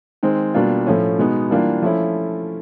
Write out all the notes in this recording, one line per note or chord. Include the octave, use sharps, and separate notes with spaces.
D#3 G#3 C4
B2 G3 A#3 D4 F4
A2 F3 A3 C#4
B2 G#3 B3 D#4
E3 G3 A#3 D4 F4
F3 A3 C#4 E4